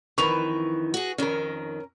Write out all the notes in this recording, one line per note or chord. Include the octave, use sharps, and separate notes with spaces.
F2 D#3 E3 B4 C#6 F7
F#4 G#4
F2 D#3 C#4 A#4